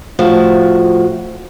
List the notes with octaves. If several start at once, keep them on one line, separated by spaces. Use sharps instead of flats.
A2 F3 F#4